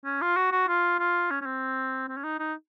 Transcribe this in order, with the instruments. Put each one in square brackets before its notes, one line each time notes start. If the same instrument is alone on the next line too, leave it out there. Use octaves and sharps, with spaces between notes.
[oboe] C#4
F4
F#4
F#4
F4
F4
C#4
C#4
C4
C4
C#4
D#4
D#4